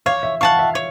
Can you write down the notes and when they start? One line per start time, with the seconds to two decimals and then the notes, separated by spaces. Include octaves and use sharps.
0.06 C#5 F5
0.23 E5
0.41 F5 F#5 A5 C#6
0.59 E5
0.75 C#5